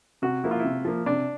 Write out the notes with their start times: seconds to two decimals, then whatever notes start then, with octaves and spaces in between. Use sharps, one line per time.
0.22 C3 F#4
0.44 F3 A#3 E4
0.51 F4
0.59 E4
0.65 C3
0.85 F3 A#3
1.06 C3 D4